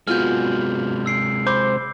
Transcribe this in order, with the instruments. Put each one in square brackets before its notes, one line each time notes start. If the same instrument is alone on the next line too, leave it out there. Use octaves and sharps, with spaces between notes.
[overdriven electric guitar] C3 G#3 [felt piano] B3 F4 F#4 [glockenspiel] F6 G6
[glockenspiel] E6 C7 D7
[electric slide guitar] C5 [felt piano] B5 [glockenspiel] D6